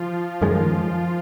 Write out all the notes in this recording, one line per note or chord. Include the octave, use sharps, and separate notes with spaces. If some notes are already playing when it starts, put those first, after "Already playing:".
Already playing: F3 F4
F#2 D#3 G#3